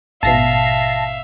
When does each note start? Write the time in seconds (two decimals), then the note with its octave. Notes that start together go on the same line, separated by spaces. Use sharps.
0.23 A1 G#2 B2 E5 F5 A5 A#6 C7